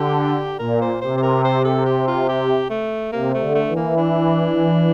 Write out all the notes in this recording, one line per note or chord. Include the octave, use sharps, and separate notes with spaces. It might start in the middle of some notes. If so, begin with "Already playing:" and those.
Already playing: D3 G4
A#2 A#4
C5
C3 C5
C5
A#4
C5
A4
G4
F4
G4
A3
C3 A#3
A3
D3
A3
E3
A#3
D4